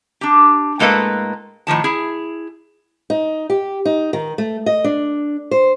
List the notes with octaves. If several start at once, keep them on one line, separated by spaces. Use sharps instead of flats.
D4 G4
A2 G#3 A#3 A4 B4 F5
A2 D#3 F3 A5
E4 G#4
D#4
G4
D#4
D#3
A3
D#5
D4
C5